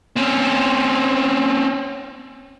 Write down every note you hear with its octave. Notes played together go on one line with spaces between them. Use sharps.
C4 C#4